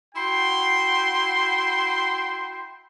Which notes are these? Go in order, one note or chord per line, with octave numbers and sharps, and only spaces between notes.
E4 F#4 G5 C6